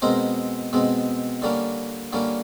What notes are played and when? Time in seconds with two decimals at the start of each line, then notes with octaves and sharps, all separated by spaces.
0.02 B2 G#3 C4 A#4 C5
0.73 B2 G#3 C4
1.42 D3 G3 A#3 C#4
2.13 D3 G3 A#3 C#4